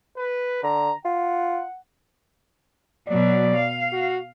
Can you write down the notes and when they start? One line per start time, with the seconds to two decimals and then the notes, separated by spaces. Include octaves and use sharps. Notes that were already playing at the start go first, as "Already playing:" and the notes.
0.17 B4
0.63 D3 A#5
1.05 F4 F#5
3.08 B2 F#3 D5
3.56 F5
3.92 F#4